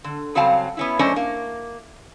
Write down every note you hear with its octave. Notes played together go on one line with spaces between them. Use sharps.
D3
C#3 F#3 G3 C4 F5 A5
B3 C#4 E4
F#2 A3 C#4 D4 C5 D#5
A#3